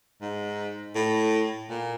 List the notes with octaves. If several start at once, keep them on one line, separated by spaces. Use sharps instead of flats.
G#2
A2
A#2